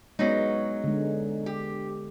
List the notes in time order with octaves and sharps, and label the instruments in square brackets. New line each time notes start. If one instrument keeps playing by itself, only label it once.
[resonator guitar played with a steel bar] F#3 C#4 D#4 [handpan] G#3 B3
[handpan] D3 G#3
[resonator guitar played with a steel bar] G4